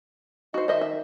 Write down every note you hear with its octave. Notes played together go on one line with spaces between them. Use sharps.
D#4 F#4 C5
D#3 C5 D#5 E5
E5